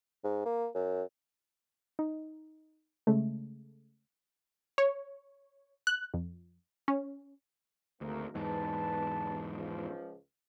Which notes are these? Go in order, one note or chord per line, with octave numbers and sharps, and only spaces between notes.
G#2
A#3
F#2
D#4
C#3 G#3 A3
C#5
F#6
F2
C#4
G#1 D2 A#3 A#4
E2 G#2 B4 A5
C#2 F3